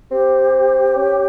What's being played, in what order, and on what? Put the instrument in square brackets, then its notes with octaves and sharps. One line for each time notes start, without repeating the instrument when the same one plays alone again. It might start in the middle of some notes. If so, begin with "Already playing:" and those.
[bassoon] C4 [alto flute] G4
[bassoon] C#4